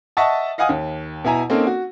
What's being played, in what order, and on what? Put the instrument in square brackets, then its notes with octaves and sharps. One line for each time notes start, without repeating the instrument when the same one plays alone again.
[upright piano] D#5 E5 F#5 A5 C#6 D#6
D#5 F5 F#5 G#5 D#6
D#2
B2 E4 G#5 A#5
A#3 C4 C#4 D#4 A4 A#4
F#4